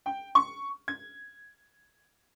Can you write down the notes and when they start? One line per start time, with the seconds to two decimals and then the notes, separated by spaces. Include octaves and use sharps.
0.06 G5
0.35 C#6
0.88 G#6